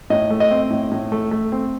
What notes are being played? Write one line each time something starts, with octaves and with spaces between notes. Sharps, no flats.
A2 D#5
A3
D#5
C4
A2
A2
A3
A3
C4